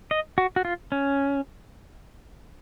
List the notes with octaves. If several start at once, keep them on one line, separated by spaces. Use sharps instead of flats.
D#5
F#4
F#4
F4
C#4